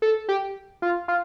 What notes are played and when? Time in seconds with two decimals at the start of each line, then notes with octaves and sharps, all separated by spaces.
0.02 A4
0.29 G4
0.82 F4
1.08 F4